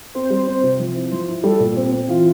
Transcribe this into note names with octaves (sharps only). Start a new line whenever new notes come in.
C4 C5
C5
G3
C5
C4 C5
C3
F3
E4
F3 C5
E4
G3 A4
A#2
C4
C4
E3 F4